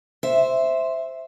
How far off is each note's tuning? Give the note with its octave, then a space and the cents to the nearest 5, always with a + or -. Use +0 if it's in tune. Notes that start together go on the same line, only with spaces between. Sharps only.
C5 +0 E5 +0